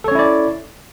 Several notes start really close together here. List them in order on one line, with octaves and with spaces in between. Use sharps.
A4 C#5 C#4 E4 D5